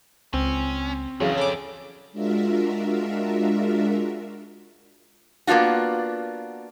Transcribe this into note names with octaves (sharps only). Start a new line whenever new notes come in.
C#2 C4 C#4
F2 C#3 E3 F#3 F#4
A4 D5 D6
G#3 D4 F4 F#4 A#4 E5
A#3 B3 D4 F4 F#4